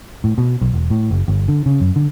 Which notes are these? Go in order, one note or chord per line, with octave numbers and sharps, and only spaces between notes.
A2
B2
B1
E1
A2
F#1
G1
D3
C#3
F#2
D3